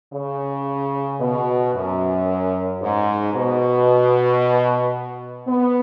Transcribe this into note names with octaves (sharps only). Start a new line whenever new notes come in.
C#3
B2
F#2
G#2
B2
B3